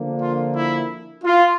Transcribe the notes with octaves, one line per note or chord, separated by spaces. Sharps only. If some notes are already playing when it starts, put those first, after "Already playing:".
Already playing: D3 F3 A#3 D4
F4
E4
F4